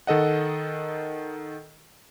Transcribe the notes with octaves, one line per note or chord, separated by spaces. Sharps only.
D#3 A4 D#5 F#5